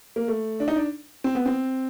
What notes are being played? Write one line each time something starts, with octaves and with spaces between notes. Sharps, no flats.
A#3
A3
D4
D#4
D4
C4
B3
C4